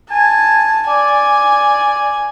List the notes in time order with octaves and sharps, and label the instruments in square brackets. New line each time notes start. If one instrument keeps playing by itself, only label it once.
[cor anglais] G#5 [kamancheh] A5
[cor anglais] D5 [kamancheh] G#5